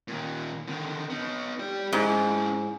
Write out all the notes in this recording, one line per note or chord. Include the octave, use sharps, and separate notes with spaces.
A#2 D#3
D3 D#3
B3 D#4
G4 D5
G#2 C#4 E4